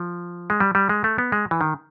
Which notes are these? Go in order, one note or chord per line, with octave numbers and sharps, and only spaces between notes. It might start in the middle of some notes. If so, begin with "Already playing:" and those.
Already playing: F3
G#3
G3
G3
G#3
A3
B3
G#3
E3
D#3